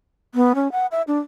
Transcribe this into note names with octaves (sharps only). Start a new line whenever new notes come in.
B3
C#4
F#5
E5
D4